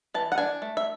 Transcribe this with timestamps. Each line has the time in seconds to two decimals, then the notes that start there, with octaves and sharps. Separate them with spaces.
0.14 E3 A5
0.32 F#5
0.38 D4 G#5
0.62 A3
0.77 E5